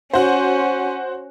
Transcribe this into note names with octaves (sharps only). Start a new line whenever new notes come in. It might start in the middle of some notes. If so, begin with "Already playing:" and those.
C#4 F#4 C5